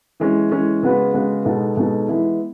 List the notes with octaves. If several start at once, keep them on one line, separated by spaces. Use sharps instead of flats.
E3 G#3 C#4
E3 G#3 C#4
C#3 G#3 B3 F#4 B4
C#3 G#3 B3 F#4 B4
B2 G#3 B3 D#4 A4
B2 G#3 B3 D#4 A4
E3 G#3 B3 E4